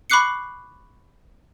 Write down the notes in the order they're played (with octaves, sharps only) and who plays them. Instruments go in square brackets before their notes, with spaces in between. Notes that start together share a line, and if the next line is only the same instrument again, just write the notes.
[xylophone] B5 C#6 D6 F#6 C7 C#7